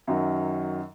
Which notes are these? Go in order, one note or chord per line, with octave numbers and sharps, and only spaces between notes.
F#2 D#3 F#3